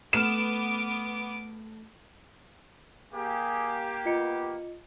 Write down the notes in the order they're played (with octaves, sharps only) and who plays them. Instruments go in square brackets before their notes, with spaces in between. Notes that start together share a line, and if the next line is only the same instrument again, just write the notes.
[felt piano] A3 F6 [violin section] B3 D6 D7 [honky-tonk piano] E7
[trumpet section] A#3 G4 [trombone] G#4
[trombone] B3 [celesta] F4 D#5 C#7